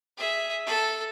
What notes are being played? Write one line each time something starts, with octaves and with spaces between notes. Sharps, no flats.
G#4 E5
A4